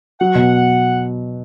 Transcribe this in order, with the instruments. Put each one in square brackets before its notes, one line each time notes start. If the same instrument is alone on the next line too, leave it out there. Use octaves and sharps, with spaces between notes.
[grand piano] F#3 [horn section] F#5
[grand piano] B2